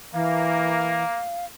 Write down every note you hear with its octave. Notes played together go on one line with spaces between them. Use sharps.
E3 A#3 F5